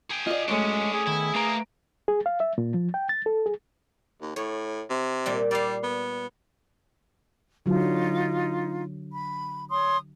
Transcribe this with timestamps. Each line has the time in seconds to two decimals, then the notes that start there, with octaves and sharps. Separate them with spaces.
0.10 G#4 G5
0.27 F4 D5 D#5
0.48 F#2 F#3 G#3 A3 C#4 D4 C#5
0.94 G#4
1.07 D#3 B3 E4
1.35 A3 A#3 D4 B4 A#5
2.08 G#4
2.26 F5
2.40 E5
2.58 A#2
2.74 F3
2.94 G5
3.09 A6
3.26 A4
3.46 G#4
4.22 D#2
4.36 A2 C#5
4.90 C3
5.26 A#2 G3
5.51 G3 D5 F5
5.83 B3
7.66 D3 F#3 D#4 F4
9.13 B5
9.70 C#5 C6 D#6